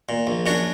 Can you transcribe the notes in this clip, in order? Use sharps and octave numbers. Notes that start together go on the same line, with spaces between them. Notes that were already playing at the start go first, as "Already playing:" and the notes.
A#2
A#1
F#2 D4 F#4